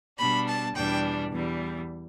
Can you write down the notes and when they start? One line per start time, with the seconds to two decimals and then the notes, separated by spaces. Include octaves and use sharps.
0.18 B2 G3 D4 B5
0.47 A5
0.75 E2 B2 G3 D4 G5
1.33 E2 E3 G3